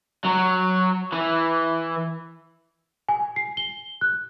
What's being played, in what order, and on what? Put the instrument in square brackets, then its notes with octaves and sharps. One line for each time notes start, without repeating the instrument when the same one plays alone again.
[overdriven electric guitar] F#3
E3
[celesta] G#5
C7
G7
F#6